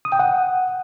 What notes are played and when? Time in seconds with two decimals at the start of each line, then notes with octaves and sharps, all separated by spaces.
0.05 D#6
0.12 G5
0.19 F#5